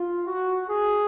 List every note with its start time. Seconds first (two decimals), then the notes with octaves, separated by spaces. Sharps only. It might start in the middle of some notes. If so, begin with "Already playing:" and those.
Already playing: F4
0.27 F#4
0.68 G#4